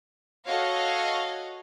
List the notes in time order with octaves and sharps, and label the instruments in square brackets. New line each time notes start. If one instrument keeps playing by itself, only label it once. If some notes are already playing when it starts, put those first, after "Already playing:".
[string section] F#4 A4 C#5 D#5 F5 F#5